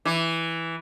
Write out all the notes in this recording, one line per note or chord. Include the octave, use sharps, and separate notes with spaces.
E3